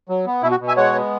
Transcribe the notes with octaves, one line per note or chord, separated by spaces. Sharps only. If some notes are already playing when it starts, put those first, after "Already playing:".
F#3
B3
B2 E4
F#4
B2
E5 G#5
G#3 C#5 F#5
B3